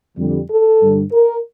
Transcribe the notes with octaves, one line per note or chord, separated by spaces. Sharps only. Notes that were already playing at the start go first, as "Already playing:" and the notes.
F2 D3 G3
A4
G2 D3 G3
A#4